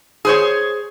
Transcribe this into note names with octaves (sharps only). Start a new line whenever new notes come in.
G#4 C5 C#5